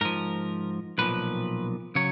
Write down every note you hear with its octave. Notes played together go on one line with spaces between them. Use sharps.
G#2 F3 A#4
B1 A#2 F3 B4
C#3 F#3 C#5